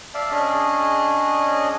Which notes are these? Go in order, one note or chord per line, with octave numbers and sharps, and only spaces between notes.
D5 E5 F5 A5
C#4 D4 G#4 D#5